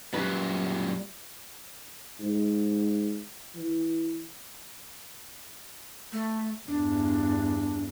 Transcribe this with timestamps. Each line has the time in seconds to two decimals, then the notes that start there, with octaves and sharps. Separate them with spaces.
0.14 F#2 A#2 G3 B4
2.20 G#2
3.56 E3
6.12 A3
6.68 E2 G2 D4